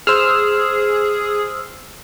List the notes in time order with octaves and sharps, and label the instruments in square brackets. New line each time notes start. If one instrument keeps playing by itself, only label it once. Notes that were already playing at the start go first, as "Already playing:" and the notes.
[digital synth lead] G#4 [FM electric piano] C5 E6 F6